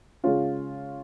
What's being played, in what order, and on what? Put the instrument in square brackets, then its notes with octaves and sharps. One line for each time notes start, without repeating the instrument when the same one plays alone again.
[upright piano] C#3 G#3 C#4 F4